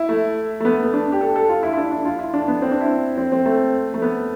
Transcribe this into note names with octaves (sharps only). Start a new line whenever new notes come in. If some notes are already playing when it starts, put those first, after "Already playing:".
Already playing: E4
A3
A3
B3
B3
D4
G4
A4
A4
F4
E4
E4
D4
D4
F4
E4
D4
B3
C4
D4
E4
C4
C4
A3
A3
B3